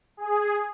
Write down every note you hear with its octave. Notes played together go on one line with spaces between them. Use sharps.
G#4